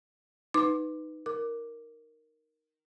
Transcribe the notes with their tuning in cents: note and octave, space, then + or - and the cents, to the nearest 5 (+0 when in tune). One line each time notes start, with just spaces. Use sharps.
D#4 +0 B4 +10 D6 +10
A#4 +0 D6 +0